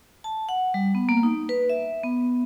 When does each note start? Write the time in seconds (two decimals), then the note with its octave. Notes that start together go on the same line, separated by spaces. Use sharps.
0.24 A5
0.49 F#5
0.74 G3
0.95 B3
1.09 A#3
1.23 D#4
1.49 B4
1.69 E5
2.03 B3